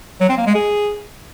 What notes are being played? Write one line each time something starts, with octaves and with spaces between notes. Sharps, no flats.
F#3
C4
A#3
G#3
G#4